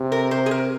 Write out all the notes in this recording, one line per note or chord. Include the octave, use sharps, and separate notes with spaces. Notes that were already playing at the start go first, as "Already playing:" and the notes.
Already playing: C3
A#4
C5
G#4
A#4